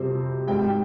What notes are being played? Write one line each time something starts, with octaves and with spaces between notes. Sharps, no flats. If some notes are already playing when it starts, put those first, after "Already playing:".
Already playing: F2 C3 G3 C5
G#2 G3 C4 G5